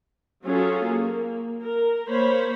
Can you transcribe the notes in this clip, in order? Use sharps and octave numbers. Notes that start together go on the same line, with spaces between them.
F#3 C#4 F4 G#4 A4
A#3
A#4
A#3 C5 C#5 B5